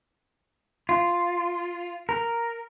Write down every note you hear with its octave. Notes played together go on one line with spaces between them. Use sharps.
F4
A#4